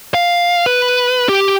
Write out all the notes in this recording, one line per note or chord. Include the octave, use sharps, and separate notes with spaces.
F5
B4
G4